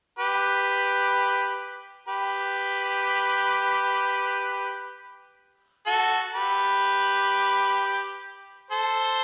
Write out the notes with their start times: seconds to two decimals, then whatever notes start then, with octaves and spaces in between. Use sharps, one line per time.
0.19 G4 B4
2.08 G4 B4
5.86 F#4 A4
6.34 G4 B4
8.71 A4 C5